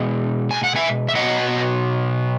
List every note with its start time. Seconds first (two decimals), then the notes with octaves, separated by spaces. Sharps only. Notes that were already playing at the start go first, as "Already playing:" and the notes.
Already playing: B2 G#3
0.51 G#5
0.64 F#5
0.76 E5 G#5
1.09 E5
1.15 B2 F#3 D#5 F#5